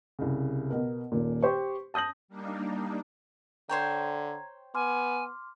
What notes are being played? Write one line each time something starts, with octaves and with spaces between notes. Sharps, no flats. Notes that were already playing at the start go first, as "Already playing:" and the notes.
C2 C#3
B2 A#4
D#1 A#2
G4 C5 C#6
A5 D#6 G6 A#6 F#7
G3 A#3 D4 D#4
D3 C5 C#5 G5 A#5 G#6
B3 G#5 C6 D6 F6